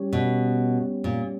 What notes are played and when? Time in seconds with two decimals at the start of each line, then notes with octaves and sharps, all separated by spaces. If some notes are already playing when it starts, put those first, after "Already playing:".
Already playing: G3 C#4 G4 C#5
0.13 B2
1.04 A#2